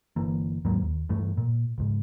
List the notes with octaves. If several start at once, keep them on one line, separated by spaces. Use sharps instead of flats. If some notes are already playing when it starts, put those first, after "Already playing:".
G1 E3 A#3
D#2 G#2 F#3 A#3
D#2
G2 E3 A3
A#2
C#2 G#2